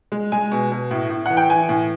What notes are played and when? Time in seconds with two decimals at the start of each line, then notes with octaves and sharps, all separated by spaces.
0.12 G#3
0.32 G#3 G#5
0.51 B2
0.71 B2
0.91 A2
1.10 A2
1.26 E3 F#5
1.37 G5
1.49 E3 G#5
1.69 A2